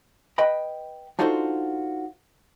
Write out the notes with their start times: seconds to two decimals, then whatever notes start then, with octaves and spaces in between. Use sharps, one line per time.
0.38 B4 D#5 G5 B5
1.19 D4 D#4 F4 F#4 A4 C5